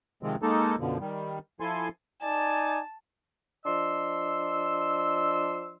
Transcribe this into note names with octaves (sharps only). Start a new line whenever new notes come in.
C3 D#3 F3 G#3 C4
G#3 A#3 D#4 A4
F#2 B2 D3 F3
D#3 G3
F3 E4 A4 G#5 C6
D#4 D5 G#5 A5
F3 D4 D#5 C6 E6